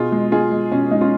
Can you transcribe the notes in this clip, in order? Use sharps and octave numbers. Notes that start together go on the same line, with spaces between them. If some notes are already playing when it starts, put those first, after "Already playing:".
Already playing: B2 F4 G#4
G#3
G#3 F4 G#4
G#3
B2 C#4
G#3 D#4
C#4 F4